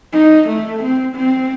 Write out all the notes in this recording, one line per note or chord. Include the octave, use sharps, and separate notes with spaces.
D#4
A3
C4
C4